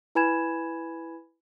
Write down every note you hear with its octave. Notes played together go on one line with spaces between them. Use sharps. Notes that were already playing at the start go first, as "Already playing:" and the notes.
E4 B4 G#5 B5 G#6 E7